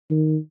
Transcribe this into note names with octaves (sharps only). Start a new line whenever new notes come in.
D#3